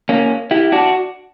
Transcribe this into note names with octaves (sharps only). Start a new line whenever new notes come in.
A#3 C#4
E4 G4
D4 F#4